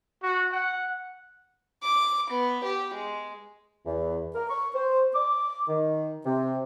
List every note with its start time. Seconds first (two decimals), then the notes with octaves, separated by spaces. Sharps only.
0.23 F#4
0.52 F#5
1.83 D6
2.30 B3
2.64 G4
2.94 G#3
3.86 E2
4.35 A#4
4.49 C#6
4.75 C5
5.14 D6
5.68 D#3
6.25 C3